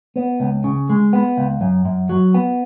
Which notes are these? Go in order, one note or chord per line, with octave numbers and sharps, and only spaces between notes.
B3
C#2
C#3
G#3
B3
C#2
F#2
F#2
F#3
B3